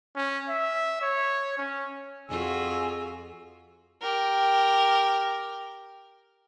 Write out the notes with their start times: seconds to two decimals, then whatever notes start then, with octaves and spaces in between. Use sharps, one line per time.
0.16 C#4
0.49 E5
1.01 C#5
1.58 C#4
2.28 F2 F4 F#4 G#4 G#5 E6
4.02 G4 A#4